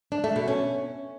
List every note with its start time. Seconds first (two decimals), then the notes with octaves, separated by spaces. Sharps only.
0.12 D4
0.24 A3
0.36 B2
0.48 C#4